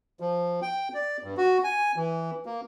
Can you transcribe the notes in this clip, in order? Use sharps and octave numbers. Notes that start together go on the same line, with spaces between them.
F3
G5
D5
G2
F#4
G#5
E3
A#3